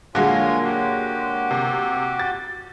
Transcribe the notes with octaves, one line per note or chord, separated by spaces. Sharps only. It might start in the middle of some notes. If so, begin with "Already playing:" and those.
A#2 D3 F#3 G#3 A#3 F4 C#5 G#5
F#4 G4
C3
A6